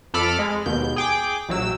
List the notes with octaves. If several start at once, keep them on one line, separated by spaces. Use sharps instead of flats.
F2 A4 B5 D6 F6
G#3
D#2 B2 G6
G#4 G5 D6
A#1 F#3 E6